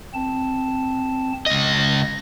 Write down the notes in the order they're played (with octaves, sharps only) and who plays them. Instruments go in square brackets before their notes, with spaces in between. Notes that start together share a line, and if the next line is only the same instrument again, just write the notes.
[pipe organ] C4 A5
[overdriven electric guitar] C#2 D#5 [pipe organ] A#6